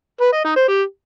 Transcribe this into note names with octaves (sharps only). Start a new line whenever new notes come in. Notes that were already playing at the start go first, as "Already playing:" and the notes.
B4
D#5
D#4
C5
G4